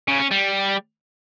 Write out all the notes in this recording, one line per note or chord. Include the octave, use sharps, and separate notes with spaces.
C#3
C#4
G3